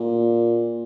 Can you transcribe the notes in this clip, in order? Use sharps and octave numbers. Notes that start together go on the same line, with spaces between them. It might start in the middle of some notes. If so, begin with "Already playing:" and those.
Already playing: A#2